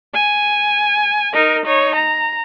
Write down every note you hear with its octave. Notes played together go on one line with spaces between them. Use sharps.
G#5
D#4 A#4
D#4 C#5
A#5